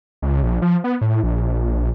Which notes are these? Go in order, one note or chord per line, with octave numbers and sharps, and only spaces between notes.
C#2
A#1
F3
B3
A2
A#1